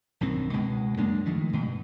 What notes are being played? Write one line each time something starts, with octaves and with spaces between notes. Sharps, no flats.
B1 G2 D#3 C4
C#2 B2 G#3
F#2 G#3 A#3 D4
D#3 F3 G#3 A3
G2 B2